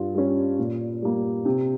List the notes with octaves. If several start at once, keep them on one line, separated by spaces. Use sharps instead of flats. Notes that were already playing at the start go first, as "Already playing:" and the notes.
Already playing: G2 F4
G3 C#4
A#2
G3 A#3
C3